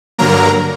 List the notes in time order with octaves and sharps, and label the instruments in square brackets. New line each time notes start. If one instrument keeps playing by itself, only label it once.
[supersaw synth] G2 D3 F#3 A#3 A#4 A#5